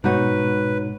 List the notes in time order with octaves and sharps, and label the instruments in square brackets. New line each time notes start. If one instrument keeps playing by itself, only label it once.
[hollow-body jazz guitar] G#2 [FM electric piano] B2 [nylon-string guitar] D#4 F#4 C#5 [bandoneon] B4